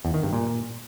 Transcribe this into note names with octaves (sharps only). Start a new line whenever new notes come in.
E2
D#3
G2
A#2